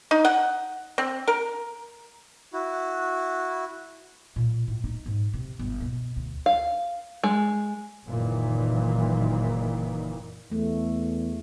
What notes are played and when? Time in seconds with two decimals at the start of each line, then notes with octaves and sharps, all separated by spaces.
0.11 D#4
0.25 F#5
0.98 C4
1.28 A#4
2.53 E4 F#4
4.36 A#2
4.68 A2
4.84 D#4
5.06 G#2
5.34 C3
5.59 G1
5.81 B2
6.16 D2
6.46 F5
7.23 G#3
8.06 F#1 A#2 D#3 E3
10.52 E2 A3